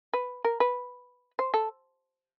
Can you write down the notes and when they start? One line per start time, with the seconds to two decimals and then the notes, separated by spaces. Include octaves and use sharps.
0.13 B4
0.44 A#4
0.60 B4
1.39 C5
1.54 A4